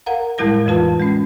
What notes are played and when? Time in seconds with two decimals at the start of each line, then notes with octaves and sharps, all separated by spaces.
0.06 A#4 F5 F#5 A#5
0.38 A2 G3 G#3 E4 A#4 A#6
0.66 F2 E3 F4 B4 A5
0.99 G#3 C#4